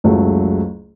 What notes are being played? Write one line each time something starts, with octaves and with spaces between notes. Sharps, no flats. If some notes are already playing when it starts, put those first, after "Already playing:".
F#1 C#2 F#3 A3